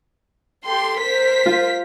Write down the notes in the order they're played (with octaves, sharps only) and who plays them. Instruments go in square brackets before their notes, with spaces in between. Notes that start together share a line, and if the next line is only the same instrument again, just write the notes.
[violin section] G4 A4 C6
A#4 C5 B6
[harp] F4